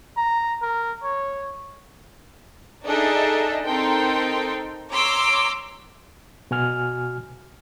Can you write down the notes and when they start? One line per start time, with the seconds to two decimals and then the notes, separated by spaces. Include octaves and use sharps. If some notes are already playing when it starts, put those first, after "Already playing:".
0.17 A#5
0.62 A#4
1.03 C#5
2.86 D4 D#4 G#4 A4 D#5 E5
3.65 C4 D#4 A4 A#4 G5 C6
4.93 C#5 A#5 C6 D6 E6
6.51 B2 F#4 G#5 F6